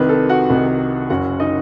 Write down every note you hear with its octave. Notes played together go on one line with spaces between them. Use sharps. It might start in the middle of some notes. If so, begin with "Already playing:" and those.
Already playing: C2 C3 D#3 B4
A4
F#4 F#5
C2 C3 D#3
F#1 F#2 F#3 F#4 F#5
D#4 D#5